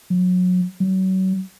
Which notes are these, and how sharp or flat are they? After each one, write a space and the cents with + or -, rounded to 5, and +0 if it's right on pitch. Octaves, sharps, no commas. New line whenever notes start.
F#3 -30
F#3 +30